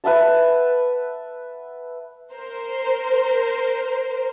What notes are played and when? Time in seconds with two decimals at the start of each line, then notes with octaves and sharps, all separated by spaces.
0.04 B4 E5 F#5 A5
2.32 A#4 C5